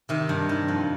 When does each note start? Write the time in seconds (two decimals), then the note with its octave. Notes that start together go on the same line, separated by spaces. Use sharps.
0.09 C3 D#3
0.29 G2
0.49 D#3
0.68 F2